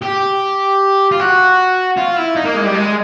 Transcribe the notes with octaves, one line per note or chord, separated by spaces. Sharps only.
G4
F4
F#4
F4
E4
D#4
A#3
G#3
G3
G#3